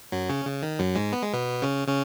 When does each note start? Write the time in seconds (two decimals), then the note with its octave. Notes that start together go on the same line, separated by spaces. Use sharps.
0.12 F#2 F#3
0.29 C#3 C#4
0.46 C#3
0.63 D#3
0.79 F#2 F#3
0.95 G#2 G#3
1.13 B3
1.23 G#3
1.33 B2 B3
1.62 C#3 C#4
1.88 C#3 C#4